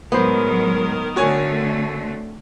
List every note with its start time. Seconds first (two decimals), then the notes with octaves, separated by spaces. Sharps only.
0.12 A2 D#3 F#3 G#3 B3 A#4 C5
1.16 D3 A3 C4 F#4 C#5 G#5